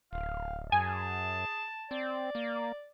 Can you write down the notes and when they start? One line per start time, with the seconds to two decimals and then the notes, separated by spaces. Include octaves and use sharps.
0.13 D1 F5
0.72 F#2 G#4 G#5 A5
1.91 C4 D5
2.35 A#3